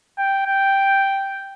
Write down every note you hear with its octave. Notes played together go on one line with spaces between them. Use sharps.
G5
G5